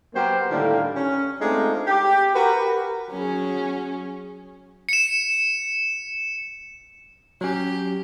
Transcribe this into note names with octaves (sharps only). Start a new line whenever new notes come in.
F#3 A#3 B3 G4 A#4 C5
A2 D3 D#3 G3 A#3
C#4
G#3 A3 C4 D4 D#4 F4
G4
F#4 G4 A#4 B4
F#3 C#4 G#4
C#7 E7
F#3 C#4 G4